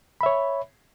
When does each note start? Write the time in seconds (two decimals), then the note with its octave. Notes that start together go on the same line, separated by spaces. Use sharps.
0.21 B5
0.23 E5
0.26 C#5